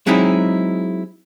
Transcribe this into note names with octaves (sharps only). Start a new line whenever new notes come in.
F#3 G#3 C4 D#4 E4 G#4